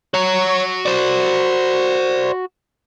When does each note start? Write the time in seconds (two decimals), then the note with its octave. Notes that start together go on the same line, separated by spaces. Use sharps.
0.14 F#4 C#5 A#5
0.86 C5 D5